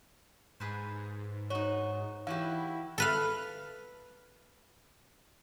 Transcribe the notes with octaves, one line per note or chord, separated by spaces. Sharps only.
G#2 G#4 B4 C5
D#4 F#4 C#5
E3 E4 F#4 G4 F5
A4 B4 F5